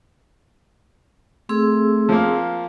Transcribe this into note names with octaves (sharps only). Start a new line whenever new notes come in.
A3 C4 G#4 E6
F3 A#3